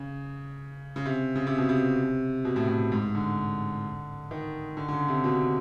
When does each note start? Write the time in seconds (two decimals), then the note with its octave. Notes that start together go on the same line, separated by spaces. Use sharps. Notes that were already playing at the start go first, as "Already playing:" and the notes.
Already playing: C#3
0.96 C#3
1.06 C3
1.35 C#3
1.47 C3
1.58 B2
1.69 C3
2.45 B2
2.56 A2
2.68 A2
2.92 G#2
3.15 D3
4.31 D#3
4.77 D3
4.88 D3
4.93 C#3
5.08 C3
5.24 B2